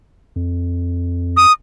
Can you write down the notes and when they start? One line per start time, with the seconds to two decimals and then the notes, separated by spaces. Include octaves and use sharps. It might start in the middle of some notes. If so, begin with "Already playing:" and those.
0.36 F2
1.37 D#6